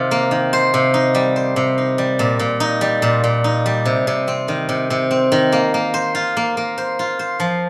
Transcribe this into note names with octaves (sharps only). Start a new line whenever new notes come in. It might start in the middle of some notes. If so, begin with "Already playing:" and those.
Already playing: C3 D#3 F4
A#3
D#3
C5
C3
D#4
G3
C5
C3
D#4
G3
A#2
A#2
D#4
G3
A#2
A#2
D#4
G3
C3
C3
C4
D#3
C3
C3
C4
D#3
A#3
A#3
C5
F4
A#3
A#3
C5
F4
C5
F3